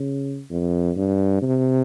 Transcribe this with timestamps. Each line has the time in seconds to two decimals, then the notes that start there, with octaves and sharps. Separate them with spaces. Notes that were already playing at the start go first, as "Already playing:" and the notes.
Already playing: C#3
0.50 F2
0.96 G2
1.42 C3